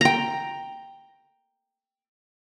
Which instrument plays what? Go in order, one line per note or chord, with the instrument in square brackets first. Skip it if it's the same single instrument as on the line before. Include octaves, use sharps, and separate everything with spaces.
[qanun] G5 A#5